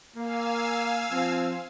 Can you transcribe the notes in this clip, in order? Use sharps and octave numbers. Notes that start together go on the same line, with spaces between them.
A#3 F5 G#5 E6
F3 C4